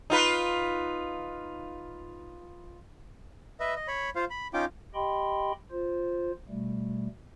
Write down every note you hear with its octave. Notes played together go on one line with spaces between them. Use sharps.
D#4 F4 B4
B4 D#5 E5
D#5
C#5 B5
F4 C5 F5
B5
C#4 D#4 F4 G5 D6
G4 D#5 G5 B5 C6
F4 C5
B2 G3 A3